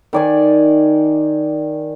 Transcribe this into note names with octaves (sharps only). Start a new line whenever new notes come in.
D#3 D5 G#5